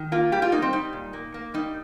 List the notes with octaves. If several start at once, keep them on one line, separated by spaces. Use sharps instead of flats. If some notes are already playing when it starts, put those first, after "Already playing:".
Already playing: D#3
A#3 F4
G3 G4
F4
A#3 D#4
C4
G3 D#4
A#2
A#3
A#3
G3 D#4